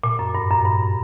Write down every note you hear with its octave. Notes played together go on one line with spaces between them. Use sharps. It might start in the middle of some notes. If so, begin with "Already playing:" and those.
A#2
F#2
G2
F#2
G2